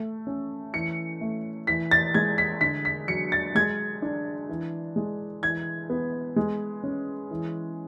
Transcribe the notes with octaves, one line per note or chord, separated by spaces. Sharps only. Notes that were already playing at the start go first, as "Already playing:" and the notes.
Already playing: A3
C#4
E3 C#7
A3
E3 B6
A6
G#3 G#6
B6
D3 B6
B6
F#3 C#7
A6
G#3 G#6
D4
E3
G#3
E3 G#6
B3
G#3
C#4
E3